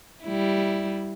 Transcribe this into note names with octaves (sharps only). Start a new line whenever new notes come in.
G3 E4